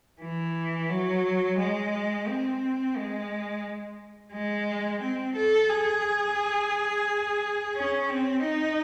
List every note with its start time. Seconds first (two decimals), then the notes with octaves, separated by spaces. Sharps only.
0.22 E3
0.90 F#3
1.59 G#3
2.28 C4
2.96 G#3
4.33 G#3
5.01 C4
5.36 A4
5.70 G#4
7.75 C#4
8.10 C4
8.44 D#4